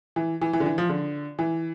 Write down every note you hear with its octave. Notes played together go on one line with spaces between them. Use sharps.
E3
E3
E3
D3
E3
F3
D3
E3